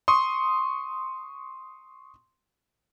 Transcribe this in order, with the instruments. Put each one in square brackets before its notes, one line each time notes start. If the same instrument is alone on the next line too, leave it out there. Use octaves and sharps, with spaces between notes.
[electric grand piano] C6 C#6 D#6